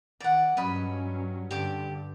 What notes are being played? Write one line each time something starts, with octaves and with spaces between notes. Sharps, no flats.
D#3 D5 F#5
G2 F#3 C#4 D#5 B5
G2 D3 G4 D6